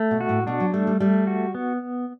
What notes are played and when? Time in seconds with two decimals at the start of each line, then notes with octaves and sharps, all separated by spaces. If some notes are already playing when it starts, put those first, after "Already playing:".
Already playing: A3
0.11 B2
0.21 F#4
0.29 A2
0.47 B2 D4
0.60 F#3
0.74 G3 A3
0.87 G3
1.00 G3 A3
1.27 F#4
1.55 B3